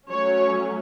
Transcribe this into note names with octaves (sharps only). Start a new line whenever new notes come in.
F#3 A3 C#4 C#5